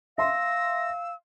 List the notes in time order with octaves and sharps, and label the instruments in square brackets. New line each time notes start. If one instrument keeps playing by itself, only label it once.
[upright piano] E5 C6 [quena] F5 [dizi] E6 [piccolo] A#6